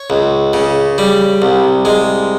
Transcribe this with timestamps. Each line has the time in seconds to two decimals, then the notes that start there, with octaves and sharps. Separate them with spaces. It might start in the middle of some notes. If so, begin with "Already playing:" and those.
Already playing: C#5
0.10 C#2
0.53 C#3
0.98 G3
1.42 C2
1.85 G#3